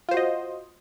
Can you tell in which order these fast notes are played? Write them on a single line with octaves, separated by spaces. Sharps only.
F4 C5 F#4 D#5